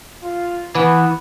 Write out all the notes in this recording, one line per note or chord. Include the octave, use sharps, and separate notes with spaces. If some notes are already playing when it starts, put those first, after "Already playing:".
F4
E3 B3